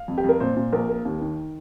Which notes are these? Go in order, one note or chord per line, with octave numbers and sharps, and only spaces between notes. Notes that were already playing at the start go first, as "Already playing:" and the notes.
Already playing: F5
F2
G4
F2 A#4
A#2 C5
A#2
A#1 A#4
A#3
D#2
D#3